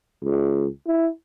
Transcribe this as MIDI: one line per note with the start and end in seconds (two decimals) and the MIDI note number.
0.23 0.67 37
0.87 1.09 64